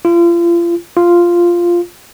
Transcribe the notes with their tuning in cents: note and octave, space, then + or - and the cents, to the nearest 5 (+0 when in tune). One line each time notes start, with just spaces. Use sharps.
F4 -35
F4 -5